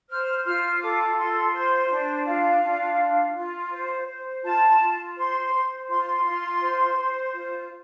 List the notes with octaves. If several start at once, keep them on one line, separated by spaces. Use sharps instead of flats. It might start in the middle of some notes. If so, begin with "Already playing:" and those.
C5 F6
F4 F6
A4 D6
F4 C6
C5
D4
F4 F5
D4
F4
F4
C5
C5
F4 A5
F4
C5 C6
C5
F4 C6
F4
C5
C5
F4